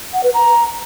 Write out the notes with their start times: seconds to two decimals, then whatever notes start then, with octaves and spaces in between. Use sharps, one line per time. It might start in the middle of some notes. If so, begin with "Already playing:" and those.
0.13 F#5
0.24 B4
0.34 A#5